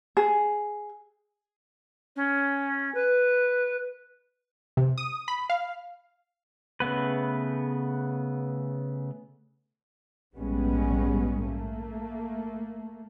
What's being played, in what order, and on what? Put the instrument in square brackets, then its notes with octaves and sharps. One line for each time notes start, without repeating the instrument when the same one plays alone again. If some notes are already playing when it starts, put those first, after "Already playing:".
[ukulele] G#4
[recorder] C#4
B4
[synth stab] C3
D#6
B5
F5
[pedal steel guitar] C#3 A3 B3 B4
[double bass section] A#1 G#2 G3 G#3 B3 C#4
A3 A#3